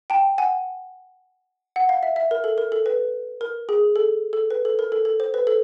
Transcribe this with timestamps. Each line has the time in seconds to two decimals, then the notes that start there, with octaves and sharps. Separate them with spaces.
0.10 G5 A5
0.38 F#5 G#5
1.76 F#5
1.89 F5
2.03 E5
2.16 E5
2.31 A#4
2.44 A4
2.58 A#4
2.72 A4
2.86 B4
3.41 A#4
3.69 G#4
3.96 A4
4.33 A4
4.51 B4
4.65 A4
4.79 A#4
4.92 A4
5.05 A4
5.20 C5
5.34 B4
5.47 A4